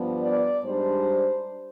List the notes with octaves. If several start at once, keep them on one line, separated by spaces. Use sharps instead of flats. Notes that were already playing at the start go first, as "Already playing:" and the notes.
Already playing: G2 F3 B3 D4
D5
G#2 G3 D4 C5